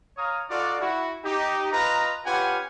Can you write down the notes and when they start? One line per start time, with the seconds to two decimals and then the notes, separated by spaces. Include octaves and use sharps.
0.17 C#5 F5 A#5 D#6
0.49 D#4 F4 F#4 A4 D5
0.80 E4 F#4
1.24 D#4 G4
1.72 F4 B4 D#5 A#5
2.25 C#4 F4 G4 B4 F#5 G#5